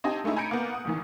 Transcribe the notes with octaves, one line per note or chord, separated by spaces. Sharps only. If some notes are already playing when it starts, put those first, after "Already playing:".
C4 D#4 G4 D#5 G#5 A5
G#3 A3 C#4 D#4 E4
G#5 A#5 B5 G6 C#7 D7
A#3 B3
F#5 D#6
A#1 D#3 E3